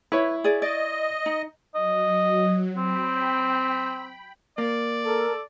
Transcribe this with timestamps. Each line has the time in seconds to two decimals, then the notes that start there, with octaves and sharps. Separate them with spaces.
0.12 E4 B4 C#5
0.44 G#4 D5
0.62 D5 D#5
1.26 D#4
1.75 F#3 D#5
2.77 C4 G5 B5
4.58 A#3 D5
5.05 A4 A#4